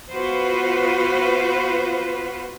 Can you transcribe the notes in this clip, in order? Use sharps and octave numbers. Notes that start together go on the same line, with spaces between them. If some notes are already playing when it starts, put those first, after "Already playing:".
B3 F4 F#4 B4 C5